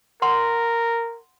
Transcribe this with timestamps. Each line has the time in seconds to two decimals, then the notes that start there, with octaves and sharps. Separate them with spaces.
0.22 A#4 F#5 C6